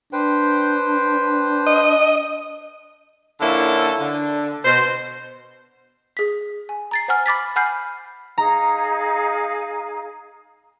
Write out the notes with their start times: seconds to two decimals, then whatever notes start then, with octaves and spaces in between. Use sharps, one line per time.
0.13 D4 B4 C5 G5
1.67 D#5
3.41 D3 F3 A#3 C#4 E4 A4
4.00 D3
4.65 B2 C5
6.17 G#4 B6
6.69 G#5
6.91 A#5 A6 C7
7.08 C5 F#5 G#5 F6
7.26 B5 D6 A6 B6
7.56 F#5 G#5 B5 F6 G6 C7
8.38 D#4 G#4 F5 A#5